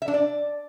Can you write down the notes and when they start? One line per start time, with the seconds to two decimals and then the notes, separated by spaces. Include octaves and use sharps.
0.02 E5
0.08 D4
0.14 D5